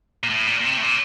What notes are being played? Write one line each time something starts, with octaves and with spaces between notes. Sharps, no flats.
A#2
A2
A#2
A#2
C3
A2
A#2